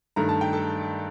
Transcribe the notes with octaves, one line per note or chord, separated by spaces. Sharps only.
G2 D#3 A3 A#5
A5
G5
A4 A5